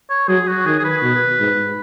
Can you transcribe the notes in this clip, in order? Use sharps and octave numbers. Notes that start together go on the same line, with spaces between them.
C#5
F#3 G#4
F#4
D#3 G#4
G#4
B4
B2
G#2